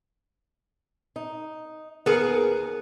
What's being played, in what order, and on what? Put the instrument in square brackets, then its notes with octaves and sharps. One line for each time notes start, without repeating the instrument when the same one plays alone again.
[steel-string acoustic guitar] D#4
[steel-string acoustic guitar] D#2 A#4 [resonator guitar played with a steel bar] B3 G#4